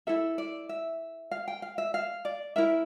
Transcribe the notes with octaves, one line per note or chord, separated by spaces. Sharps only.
E4 A4 E5
D5
E5
F5
G5
F5
E5
F5
D5
E4 A#4 E5